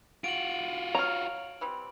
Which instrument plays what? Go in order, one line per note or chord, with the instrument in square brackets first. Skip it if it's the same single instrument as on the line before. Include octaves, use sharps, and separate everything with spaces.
[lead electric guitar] F4 F#4 [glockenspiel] D7 F#7
[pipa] C#5 F5 [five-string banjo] A#5
[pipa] E3 G3 C4